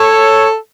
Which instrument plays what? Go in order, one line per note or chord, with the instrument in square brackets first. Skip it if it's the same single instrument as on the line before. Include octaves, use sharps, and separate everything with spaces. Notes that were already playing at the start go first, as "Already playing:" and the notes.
Already playing: [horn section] A4 C#5